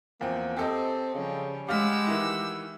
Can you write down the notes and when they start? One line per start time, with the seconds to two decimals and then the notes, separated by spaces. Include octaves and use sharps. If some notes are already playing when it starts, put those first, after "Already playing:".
0.21 E2 F3 A#3 C4
0.57 C4 G4 A4 D#5
1.14 C#3 F3 G3 C#4
1.68 G#3 G4 F5 F#5 B5 E6 F6 B6
2.07 D#3 E3 E4